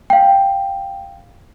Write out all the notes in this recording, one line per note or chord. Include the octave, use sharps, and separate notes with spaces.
F5 G5